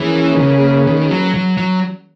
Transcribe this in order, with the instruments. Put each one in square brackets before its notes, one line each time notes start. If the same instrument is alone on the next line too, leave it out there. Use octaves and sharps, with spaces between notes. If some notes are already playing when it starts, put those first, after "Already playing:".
Already playing: [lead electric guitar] E3 [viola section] A#3 C#4 G#4 B4
[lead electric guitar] D#3
C#3
D#3
F#3
F#3
F#3